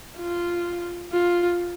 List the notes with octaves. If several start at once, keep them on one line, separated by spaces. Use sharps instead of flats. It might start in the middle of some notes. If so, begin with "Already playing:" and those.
F4
F4